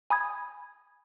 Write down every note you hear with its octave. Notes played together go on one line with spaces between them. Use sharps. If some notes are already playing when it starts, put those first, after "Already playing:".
G#5 B5 D#6 G#6